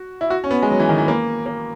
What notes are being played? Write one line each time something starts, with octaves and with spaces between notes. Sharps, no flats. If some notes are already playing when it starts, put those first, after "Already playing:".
Already playing: F#4
E4
F#4
C#4
B3
G#3
F#3
E3
D#3
E3
A#3
A#3